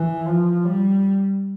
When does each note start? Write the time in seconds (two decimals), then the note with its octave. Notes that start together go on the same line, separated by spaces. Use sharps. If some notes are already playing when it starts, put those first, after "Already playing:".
Already playing: E3
0.26 F3
0.65 G3